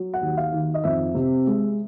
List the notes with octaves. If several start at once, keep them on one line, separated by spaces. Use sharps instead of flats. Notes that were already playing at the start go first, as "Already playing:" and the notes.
Already playing: F#3
F#5
D#2
F5
D#3
D#5
F2 E5
C3
G#3